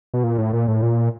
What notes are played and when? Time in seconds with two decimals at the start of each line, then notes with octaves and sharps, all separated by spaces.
0.14 B2
0.24 A#2
0.38 A2
0.53 A#2
0.68 A2
0.82 A#2